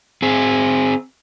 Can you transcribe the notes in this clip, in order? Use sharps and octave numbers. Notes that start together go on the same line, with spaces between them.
C4 G#4